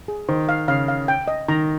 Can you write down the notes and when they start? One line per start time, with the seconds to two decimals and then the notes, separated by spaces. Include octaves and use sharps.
0.08 G#4
0.29 D#3 C5
0.49 F5
0.68 C#3 F5
0.88 F5
1.08 G5
1.28 D#5
1.48 D#3 A#5